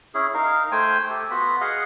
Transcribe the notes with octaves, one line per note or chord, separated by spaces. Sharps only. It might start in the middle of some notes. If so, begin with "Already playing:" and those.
C#4 E4 G#4
D#4 A#4 F5
A3 C5 G5 G#5
G4 A4
B3 F4 F#4 B5
G#4 D#5 F5 F#5